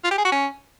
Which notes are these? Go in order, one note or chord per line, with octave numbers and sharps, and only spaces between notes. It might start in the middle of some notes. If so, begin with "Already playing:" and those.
F4
G4
G#4
F#4
C#4